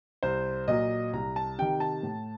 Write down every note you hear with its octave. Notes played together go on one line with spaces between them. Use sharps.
C2 C5
A#2 F#3 D#5
C2 A#5
A5
C3 D#3 G5
A5
A2